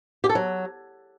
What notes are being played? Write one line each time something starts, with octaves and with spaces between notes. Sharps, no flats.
G4
A4
F#3